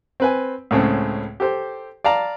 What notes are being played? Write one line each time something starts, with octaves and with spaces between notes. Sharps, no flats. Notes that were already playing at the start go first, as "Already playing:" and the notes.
C4 B4 G#5
C#2 A2 C#3 C4
G4 A4 C5
D5 F5 A5 A#5